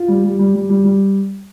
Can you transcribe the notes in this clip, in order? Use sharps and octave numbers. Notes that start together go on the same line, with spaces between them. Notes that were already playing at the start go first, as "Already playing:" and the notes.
Already playing: F4
G3
G3
G3
G3
G3
G3